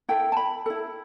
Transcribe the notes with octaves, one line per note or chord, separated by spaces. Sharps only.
E4 A4 G5
A5
B5
E4 A4